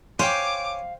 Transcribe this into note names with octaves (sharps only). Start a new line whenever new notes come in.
C5 C#5 F5 G5 G#5 D6